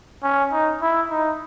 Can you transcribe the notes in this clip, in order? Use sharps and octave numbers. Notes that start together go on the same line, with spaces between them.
C#4
D#4
E4
D#4